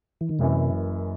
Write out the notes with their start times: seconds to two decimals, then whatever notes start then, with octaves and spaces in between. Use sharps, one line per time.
0.21 E3
0.29 D#3
0.39 F#1 F#2 C3 E3